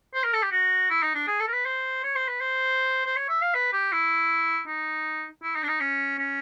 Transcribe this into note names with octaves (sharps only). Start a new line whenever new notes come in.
C5
A#4
A4
G4
F#4
E4
D#4
D4
G#4
A4
A#4
B4
C5
C#5
C5
B4
C5
C5
C#5
E5
F5
B4
G4
E4
D#4
E4
D#4
D4
D#4
C#4
C#4